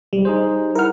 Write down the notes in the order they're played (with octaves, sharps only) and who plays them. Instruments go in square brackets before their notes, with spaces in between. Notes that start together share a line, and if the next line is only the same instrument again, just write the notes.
[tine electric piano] B1 [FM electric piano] G3
[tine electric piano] D#4 G#4 C5
[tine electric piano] E4 F#5 [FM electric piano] A#4 F6